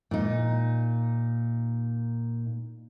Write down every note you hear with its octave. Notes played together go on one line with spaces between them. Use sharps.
A#2 D#4